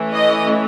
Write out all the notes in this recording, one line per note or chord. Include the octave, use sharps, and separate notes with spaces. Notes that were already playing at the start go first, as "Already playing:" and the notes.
Already playing: E3 A3 C#4
D#5